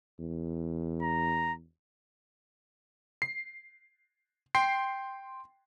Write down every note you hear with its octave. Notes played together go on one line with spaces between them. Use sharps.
E2
A#5
C7
G5 C6 C7